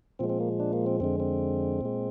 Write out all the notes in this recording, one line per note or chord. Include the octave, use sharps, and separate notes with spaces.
A#2 F3 G#3 C4
C4
A#3
D4
A#3
C4
F2 D3 G#3 C4
C4
A#2 G#3